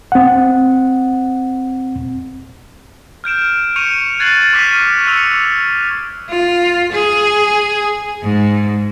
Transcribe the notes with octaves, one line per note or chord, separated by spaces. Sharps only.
C4 F#5
F6 G6 D7 E7
C#6 G6 C#7 D#7 F7
F#6 G#6 A6 C7 F#7
C#6 D6 F6 B6 C7 D#7
C#6 E6 C#7 F7
F7
F4
G#4
G#2